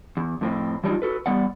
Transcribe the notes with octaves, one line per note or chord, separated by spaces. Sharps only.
E2
F2 A2 C4
E3 F#3 G3 D4 D#4 F4
F#4 A4 B4
E2 G3 B3 D5 F#5